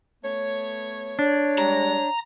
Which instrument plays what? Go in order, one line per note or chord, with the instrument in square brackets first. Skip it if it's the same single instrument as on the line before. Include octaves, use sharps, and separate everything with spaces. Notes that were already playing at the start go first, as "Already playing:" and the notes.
[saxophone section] A3 B3 C#5
[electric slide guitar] D4 [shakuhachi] C#5
[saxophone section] G3 G#3 [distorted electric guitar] A#5